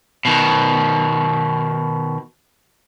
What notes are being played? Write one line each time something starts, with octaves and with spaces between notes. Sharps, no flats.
B2 D#3